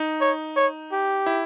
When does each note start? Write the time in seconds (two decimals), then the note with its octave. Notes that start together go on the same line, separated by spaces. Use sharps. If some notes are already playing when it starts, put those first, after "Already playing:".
Already playing: D#4
0.21 C#5
0.56 C#5
0.92 G4
1.26 E4